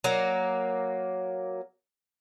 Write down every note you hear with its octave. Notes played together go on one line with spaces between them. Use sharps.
F#3 A#3